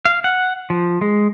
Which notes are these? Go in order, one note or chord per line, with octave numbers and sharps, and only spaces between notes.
F5
F#5
F3
G#3